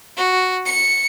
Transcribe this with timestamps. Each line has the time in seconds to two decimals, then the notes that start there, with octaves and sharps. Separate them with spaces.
0.17 F#4
0.66 C#7